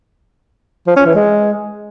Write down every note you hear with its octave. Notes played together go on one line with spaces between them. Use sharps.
F3
C#4
E3
G#3